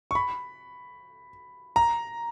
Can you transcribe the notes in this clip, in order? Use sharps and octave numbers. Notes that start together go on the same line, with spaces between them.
C#6
B5
A#5